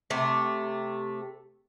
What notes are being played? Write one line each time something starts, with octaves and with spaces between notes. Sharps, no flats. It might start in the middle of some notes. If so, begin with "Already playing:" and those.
C3 A3 G4